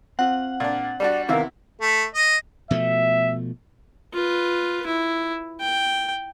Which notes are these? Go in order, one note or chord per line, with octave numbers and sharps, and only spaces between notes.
C4 F4 F#5
A#2 D4
G3 D4 F#4 D5
C3 D#3 B3 E4 A#4 F5 E6
A3
D#5
B2 F3 A3 E5
F4 B4
E4
G5